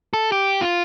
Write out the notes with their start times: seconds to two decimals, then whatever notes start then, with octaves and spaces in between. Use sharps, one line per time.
0.13 A4
0.32 G4
0.61 F4